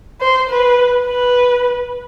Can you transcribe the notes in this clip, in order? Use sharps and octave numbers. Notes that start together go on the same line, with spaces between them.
C5
B4
B4